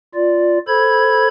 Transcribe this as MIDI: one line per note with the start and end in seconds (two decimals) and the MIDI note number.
0.14 0.58 65
0.14 0.58 74
0.68 1.28 69
0.68 1.28 72
0.68 1.28 83
0.68 1.28 92